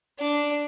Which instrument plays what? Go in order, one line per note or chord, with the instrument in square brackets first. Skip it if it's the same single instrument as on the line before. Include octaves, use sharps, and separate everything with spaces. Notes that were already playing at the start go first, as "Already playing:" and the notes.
[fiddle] D4